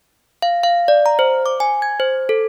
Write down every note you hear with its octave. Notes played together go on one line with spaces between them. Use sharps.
F5
F5
D5
A#5
C5
D6
G#5
G#6
C5
A4